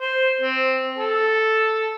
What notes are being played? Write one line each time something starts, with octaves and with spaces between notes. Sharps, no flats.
C5
C4
A4